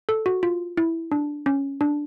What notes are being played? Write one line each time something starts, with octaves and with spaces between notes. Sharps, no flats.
A4
F#4
F4
E4
D4
C#4
D4